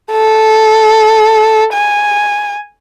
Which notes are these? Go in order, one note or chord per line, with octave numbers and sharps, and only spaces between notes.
A4
G#5